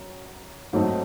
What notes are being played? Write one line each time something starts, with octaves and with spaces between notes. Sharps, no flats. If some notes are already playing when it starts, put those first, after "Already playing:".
Already playing: F#2
G#2 F#3 A3 C4 D#4